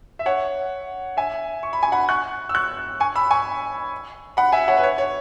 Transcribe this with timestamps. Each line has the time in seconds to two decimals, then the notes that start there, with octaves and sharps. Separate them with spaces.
0.19 E5
0.26 C#5 F#5
1.17 E5 G#5
1.63 C#6
1.73 B5
1.83 G#5
1.92 F#5 B5
2.09 C#6 F#6
2.49 E6
2.55 C#6 F#6
3.00 G#5 C#6
3.15 B5 E6
3.31 G#5 C#6
4.37 F#5 B5
4.52 E5 G#5
4.68 C#5 F#5
4.77 B4
4.83 C#5
4.98 C#5